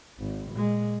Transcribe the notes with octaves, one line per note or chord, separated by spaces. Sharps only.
G#1
A#2 G#3